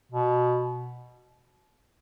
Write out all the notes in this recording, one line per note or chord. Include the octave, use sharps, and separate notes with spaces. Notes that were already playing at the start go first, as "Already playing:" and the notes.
B2